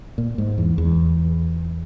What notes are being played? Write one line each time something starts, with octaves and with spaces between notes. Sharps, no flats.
A#2
G#2
E2
E2